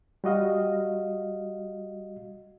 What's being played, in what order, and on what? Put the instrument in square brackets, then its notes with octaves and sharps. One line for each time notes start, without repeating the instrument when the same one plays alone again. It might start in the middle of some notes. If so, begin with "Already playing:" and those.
[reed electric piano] G3 F#4 D#5 F5